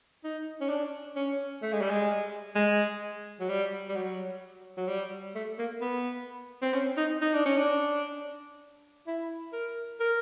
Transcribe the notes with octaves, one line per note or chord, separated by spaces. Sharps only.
D#4
C#4
D4
C#4
A3
G#3
G3
G#3
G#3
F#3
G3
G3
F#3
F#3
G3
A3
A#3
B3
C4
C#4
D#4
D#4
D4
C#4
D4
E4
A#4
A#4